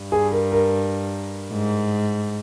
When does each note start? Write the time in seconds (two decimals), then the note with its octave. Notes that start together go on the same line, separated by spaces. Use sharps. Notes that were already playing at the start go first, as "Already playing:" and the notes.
Already playing: G2
0.12 G#4
0.32 A#4
0.52 A#4
1.52 G#2